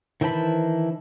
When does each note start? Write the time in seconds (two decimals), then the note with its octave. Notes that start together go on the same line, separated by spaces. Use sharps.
0.21 D#3 E3 C5 A5 B5